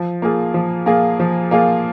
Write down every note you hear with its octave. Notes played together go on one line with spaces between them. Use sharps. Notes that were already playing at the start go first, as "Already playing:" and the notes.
Already playing: F3
A#3 F4 G#4
F3
A#3 F4 G#4
F3
A#3 F4 G#4